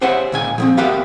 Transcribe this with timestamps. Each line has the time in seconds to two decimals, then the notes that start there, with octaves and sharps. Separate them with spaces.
0.01 G4 G#4 C5 C#5 E5 F#5
0.32 C#2 A#2 G#5
0.58 F3 G#3 C4
0.77 B3 F#4 G4 A#4 E5 F5